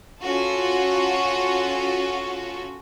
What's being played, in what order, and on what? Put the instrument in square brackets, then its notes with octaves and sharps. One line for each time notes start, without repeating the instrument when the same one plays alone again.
[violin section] C#4 F4 F#4 A4